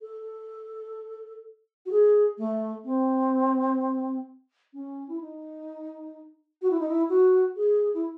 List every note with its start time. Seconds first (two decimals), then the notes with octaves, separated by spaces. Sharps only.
0.02 A4
1.86 F#4
1.91 G#4
2.38 A3
2.84 C4
4.74 C#4
5.09 E4
5.21 D#4
6.62 F#4
6.71 E4
6.80 D#4
6.89 E4
7.09 F#4
7.56 G#4
7.94 E4